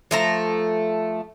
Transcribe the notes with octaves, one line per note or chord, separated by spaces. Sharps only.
F3 A3 A#5